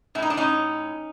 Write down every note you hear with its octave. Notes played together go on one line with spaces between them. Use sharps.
A2 E4
D#4
D4
A2 C#4 D#4